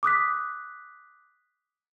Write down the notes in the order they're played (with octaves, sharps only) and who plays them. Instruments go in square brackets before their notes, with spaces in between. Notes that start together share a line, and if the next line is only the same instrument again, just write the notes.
[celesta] D6 D#6 F#6 B6